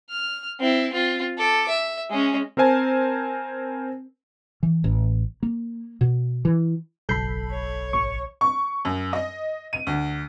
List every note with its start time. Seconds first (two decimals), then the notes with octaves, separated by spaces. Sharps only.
0.10 F6
0.60 C4 E4
0.93 C4 F4
1.38 A4 D6
1.69 E5
2.10 G#3 C#4
2.57 C4 A#4 C5 G#5 A5
4.63 E3
4.84 A1
5.43 A#3
6.01 B2
6.45 E3
7.09 F#1 B1 A4 B5 G6 C7
7.49 C#5
7.93 G#1 C#6
8.41 C#6
8.85 F#2
9.13 D#5
9.73 D#7
9.87 D2